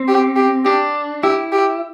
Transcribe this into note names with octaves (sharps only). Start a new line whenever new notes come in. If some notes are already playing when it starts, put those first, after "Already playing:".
Already playing: C4
G4
G4
D4 G4
E4 G4
G4